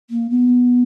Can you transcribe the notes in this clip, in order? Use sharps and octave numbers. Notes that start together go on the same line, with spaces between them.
A#3
B3